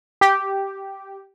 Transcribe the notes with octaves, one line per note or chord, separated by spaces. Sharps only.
G4